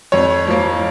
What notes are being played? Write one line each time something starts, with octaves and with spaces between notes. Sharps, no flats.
F2 C#5
F3 A#3